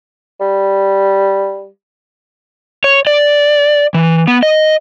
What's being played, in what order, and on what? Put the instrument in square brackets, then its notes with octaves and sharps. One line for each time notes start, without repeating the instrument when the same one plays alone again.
[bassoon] G3
[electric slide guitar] C#5
D5
E3
B3
D#5